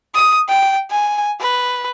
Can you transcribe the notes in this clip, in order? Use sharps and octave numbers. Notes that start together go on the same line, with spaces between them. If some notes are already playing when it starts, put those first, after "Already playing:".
D#6
G5
G#5
B4